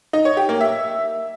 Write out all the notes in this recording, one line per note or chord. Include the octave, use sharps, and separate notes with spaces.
D#4
C#5
G4
A#3
E5